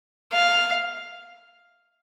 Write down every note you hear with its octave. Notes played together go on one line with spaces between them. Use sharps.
F5